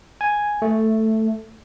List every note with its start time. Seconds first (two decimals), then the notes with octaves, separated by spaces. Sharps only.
0.21 G#5
0.62 A3